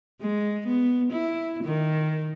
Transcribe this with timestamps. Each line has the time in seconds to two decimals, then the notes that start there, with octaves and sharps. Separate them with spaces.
0.21 G#3
0.67 B3
1.12 E4
1.64 D#3